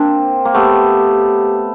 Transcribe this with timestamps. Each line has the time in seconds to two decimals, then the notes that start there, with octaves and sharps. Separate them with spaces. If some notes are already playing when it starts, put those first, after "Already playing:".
Already playing: A#3 C4 D4
0.45 A#3
0.54 A3 B3 G4